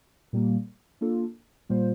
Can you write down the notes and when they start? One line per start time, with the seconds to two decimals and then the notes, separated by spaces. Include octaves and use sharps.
0.33 A#2 G3 A#3
1.01 A#3 D4 F4 A4
1.69 A#2 G3 A#3 F4 C5